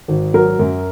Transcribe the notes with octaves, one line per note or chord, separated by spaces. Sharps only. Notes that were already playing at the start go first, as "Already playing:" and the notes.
G#1
F#3 A#4
F#2